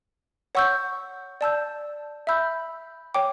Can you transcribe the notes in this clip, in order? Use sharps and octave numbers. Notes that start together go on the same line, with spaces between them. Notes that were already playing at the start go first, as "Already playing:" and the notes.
C#5 F#5 C#6 E6 G6
D5 A5 E6 G6
E5 B5 E6 G6
C#5 G5 D6